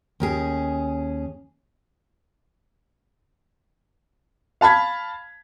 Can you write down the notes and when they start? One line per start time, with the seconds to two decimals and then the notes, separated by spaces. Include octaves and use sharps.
0.20 D#2 C#4 G#4
4.61 F5 A5 B5 G#6 B6